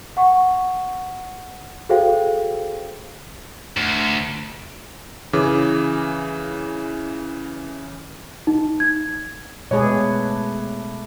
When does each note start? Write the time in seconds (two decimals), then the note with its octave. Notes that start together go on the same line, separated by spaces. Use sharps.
0.17 F#5 C#6
1.89 F#4 G#4 A4 C5 F5 G5
3.77 D2
5.33 C#3 E3 D6
8.47 D#4
8.80 G#6
9.71 B2 G#3 A3 D4 G#4 B4 C#5